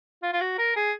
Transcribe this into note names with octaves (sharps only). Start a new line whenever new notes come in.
F4
F4
F#4
A#4
G#4